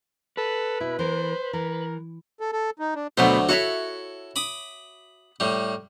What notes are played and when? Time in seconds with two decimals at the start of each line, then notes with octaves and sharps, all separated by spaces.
0.37 A4 B4
0.80 B2 E4
0.99 E3 A#4 C5
1.53 E3 A#4
2.40 A4
2.52 A4
2.79 D#4
2.95 D4
3.17 D2 B2 F#3 A3 B3 C5
3.49 E4 F#4 A4 C#5 E5
4.36 B5 D6 D#6
5.40 A2 G3